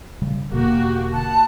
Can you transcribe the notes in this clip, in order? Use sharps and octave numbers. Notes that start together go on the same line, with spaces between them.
C#3 G3
E1 B2 D3 A#3 F#4 G4
F#5 A5